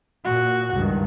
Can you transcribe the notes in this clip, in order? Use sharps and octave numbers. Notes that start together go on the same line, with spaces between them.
A#2 F#4
C#2 G2 D#3